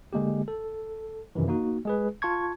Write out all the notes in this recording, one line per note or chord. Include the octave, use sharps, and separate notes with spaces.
D3 G#3 A#3 G4
A4
F#2 C3 D#3 E3
A#3 D#4 F#4
G#3 G#4 B4
F4 A5 C#6 G#6